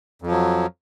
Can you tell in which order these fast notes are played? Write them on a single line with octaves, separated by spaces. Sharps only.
F2 F3 F#3